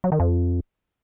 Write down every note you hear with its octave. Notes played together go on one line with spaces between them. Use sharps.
F#3
D#3
F2